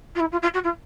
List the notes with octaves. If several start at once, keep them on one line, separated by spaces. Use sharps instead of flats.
F4
E4
F4
F4
F#4
F4